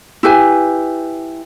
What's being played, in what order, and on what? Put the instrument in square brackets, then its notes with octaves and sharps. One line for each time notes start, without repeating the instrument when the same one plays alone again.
[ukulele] E4 G4 B4 G#5